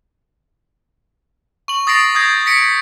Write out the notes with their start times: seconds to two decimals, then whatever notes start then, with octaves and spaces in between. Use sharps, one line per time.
1.68 C#6 F#7
1.87 D#6 A6 A#6 C7 D7
2.15 D#6 G6 G#6 A#6
2.46 A#6 B6 C#7 D7